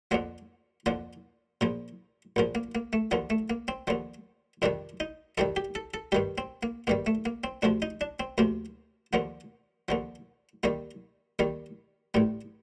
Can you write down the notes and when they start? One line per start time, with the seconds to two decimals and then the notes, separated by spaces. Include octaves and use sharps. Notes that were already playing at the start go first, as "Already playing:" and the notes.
0.11 F2 D3 F3 A#3
0.86 F2 D3 F3 A#3
1.61 A#1 A#2 F3
2.36 A#1 A#2 F3
2.55 A#3
2.75 A#3
2.93 A3
3.11 D#2 D3 F3 A#3
3.30 A3
3.50 A#3
3.68 C4
3.87 D#2 D3 F3
4.62 F2 C3 D#3 G3 D4
5.00 D#4
5.38 F2 C3 D#3 G3 A4
5.56 G4
5.75 A4
5.94 A4
6.12 G2 D#3 G3 G4
6.38 C4
6.63 A#3
6.87 G2 D#3 G3 A#3
7.06 A3
7.26 A#3
7.44 C4
7.62 D2 C3 F3 D4
7.82 D#4
8.01 D4
8.20 C4
8.38 D2 C3 F3 A#3
9.13 D#2 D3 F3 A#3
9.89 D#2 D3 F3
10.63 D#2 D#3 G3 A#3
11.39 D#2 D#3 G3
12.14 A1 A2 G3